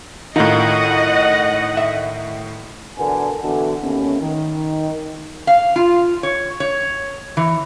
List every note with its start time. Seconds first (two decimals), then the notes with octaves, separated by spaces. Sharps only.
0.36 A2 D#3 D#4 F4 D#5 F#5
1.77 E5
2.98 E2 B2 D3 B3 A#4 G#5
3.43 B2 D3 E3
3.82 D#2 A3 B3 C#4
4.21 D#3
5.47 F5
5.76 F4
6.23 C#5
6.60 C#5
7.37 E3